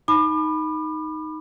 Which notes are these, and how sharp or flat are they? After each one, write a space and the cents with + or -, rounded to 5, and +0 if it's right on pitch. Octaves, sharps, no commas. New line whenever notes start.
D#4 +0 B5 +0 D6 +40